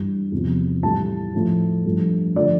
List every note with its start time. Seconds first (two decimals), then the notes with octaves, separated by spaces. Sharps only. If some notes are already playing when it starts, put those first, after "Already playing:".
Already playing: G2 E3 G3
0.32 E2 C3 F3
0.83 A2 E3 G3 A5
1.34 A2 F3 A3
1.85 G2 F3 A3
2.36 D3 F3 A3 D5